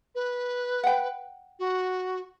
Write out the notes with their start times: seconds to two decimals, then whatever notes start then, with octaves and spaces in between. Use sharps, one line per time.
0.15 B4
0.84 F#5 G5
1.59 F#4